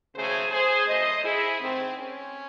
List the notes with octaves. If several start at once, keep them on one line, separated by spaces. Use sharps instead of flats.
D#2 C#3 F#3 A3 G#4 C5
G#4 C5
F#2 E3 A3 C5 D#5
E4 G#4
G#2 D#3 A3 C4
C#4